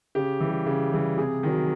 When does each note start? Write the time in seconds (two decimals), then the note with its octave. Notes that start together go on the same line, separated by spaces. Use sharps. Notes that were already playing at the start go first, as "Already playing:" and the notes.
0.15 C#3 G4
0.40 E3
0.46 G3
0.66 C#3
0.92 E3 G3
1.17 C3 G#4
1.43 D#3 F#3